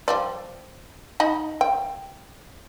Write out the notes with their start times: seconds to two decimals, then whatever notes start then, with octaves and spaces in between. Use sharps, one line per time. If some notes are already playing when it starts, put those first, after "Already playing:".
0.08 F3 G3 D5
1.20 D#4 D#5 B5
1.61 G5